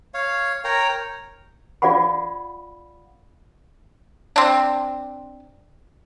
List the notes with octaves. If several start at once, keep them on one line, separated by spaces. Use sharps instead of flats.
C#5 F5
A#4 C#5 G5 A#5
F4 D5 F5 F#5 B5
C4 D4